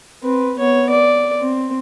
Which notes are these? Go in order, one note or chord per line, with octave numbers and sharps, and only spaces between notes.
C4 B4
B3 C#5
D5
C4